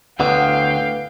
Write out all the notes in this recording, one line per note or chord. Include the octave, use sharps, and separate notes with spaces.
D2 A2 D3 B3 F5 G5